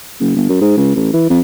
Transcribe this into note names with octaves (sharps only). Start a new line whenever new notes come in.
F#1
G1
F#2
G#2
C#2
A1
E3
F2